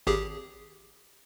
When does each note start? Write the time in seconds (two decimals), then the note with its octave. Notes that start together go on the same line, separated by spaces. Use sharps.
0.07 G#1 G4 G#4